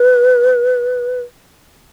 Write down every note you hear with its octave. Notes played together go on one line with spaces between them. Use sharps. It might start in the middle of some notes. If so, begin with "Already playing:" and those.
Already playing: B4